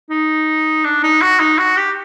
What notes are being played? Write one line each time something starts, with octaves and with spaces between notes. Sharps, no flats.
D#4
D4
D#4
F#4
D#4
F#4
G4